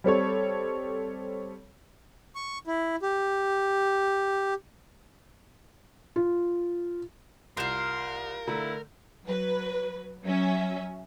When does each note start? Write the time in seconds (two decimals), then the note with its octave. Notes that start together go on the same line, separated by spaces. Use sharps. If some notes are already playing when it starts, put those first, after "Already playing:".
0.04 G3 C4 A4 C#5
2.35 C#6
2.67 E4
3.02 G4
6.16 F4
7.57 C2 F4 A#4 F5 C6 G6 E7
8.47 D3 A3 E4 A#5
9.24 F#3 B4
10.24 F#3 C#4 E5